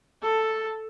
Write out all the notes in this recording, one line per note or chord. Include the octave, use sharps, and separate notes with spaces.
A4